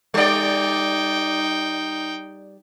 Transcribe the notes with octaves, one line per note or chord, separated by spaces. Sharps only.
G3 D#4 D5 G5